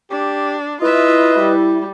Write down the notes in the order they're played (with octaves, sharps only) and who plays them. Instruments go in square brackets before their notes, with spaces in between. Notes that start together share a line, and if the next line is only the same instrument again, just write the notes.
[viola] D4 [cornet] G4
[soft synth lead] E4 [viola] F4 E5 [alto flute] B4 [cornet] D#5
[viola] G3